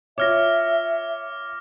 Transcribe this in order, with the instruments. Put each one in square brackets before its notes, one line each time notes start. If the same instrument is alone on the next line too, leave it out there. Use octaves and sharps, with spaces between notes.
[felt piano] F4 C#5 [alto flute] E5 [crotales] D6 F6 A#6